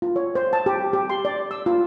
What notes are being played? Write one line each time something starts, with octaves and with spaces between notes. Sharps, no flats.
F4
C#5
C5
A5
G4
G4
C6
D5
E6
F4